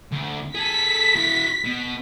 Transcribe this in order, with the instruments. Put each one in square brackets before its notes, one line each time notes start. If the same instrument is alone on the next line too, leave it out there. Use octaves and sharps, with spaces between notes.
[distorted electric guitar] D2
[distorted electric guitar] G#4 A4 [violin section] B6
[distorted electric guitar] E4 F#4
B2